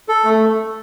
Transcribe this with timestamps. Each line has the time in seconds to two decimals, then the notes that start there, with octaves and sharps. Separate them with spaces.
0.09 A4
0.24 A3